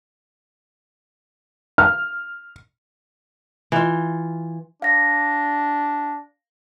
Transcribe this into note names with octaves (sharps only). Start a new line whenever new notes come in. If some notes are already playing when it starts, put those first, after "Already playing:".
F6
E3 F4
D4 F5 A#6